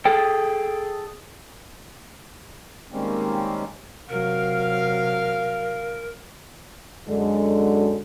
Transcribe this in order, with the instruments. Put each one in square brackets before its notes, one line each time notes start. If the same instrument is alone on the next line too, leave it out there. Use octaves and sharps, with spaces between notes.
[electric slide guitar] G#4 A4 G5
[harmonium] D#3 G3 G#3 A#3 C4 C#4
[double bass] C3 F#3 [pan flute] A#4 [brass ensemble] F5
[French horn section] F#2 D3 G#3